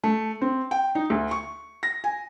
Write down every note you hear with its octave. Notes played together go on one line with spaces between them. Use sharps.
A3
C4
G5
D#4
D2
C#6
A#6
G#5